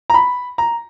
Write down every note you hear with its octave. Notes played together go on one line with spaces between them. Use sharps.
A#5
B5
A#5